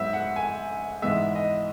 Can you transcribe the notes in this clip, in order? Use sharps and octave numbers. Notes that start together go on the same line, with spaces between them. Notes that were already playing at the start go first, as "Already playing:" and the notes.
Already playing: G#2 F#3 B3 E5
F#5
G#5
G#2 E3 G#3 B3 E5
D#5